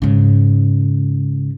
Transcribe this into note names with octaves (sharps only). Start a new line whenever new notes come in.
G#2 C#3